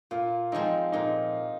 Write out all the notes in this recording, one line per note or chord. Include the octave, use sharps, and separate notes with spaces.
A#2 F4
F3 G#3 C4 D#4
A#2 D#4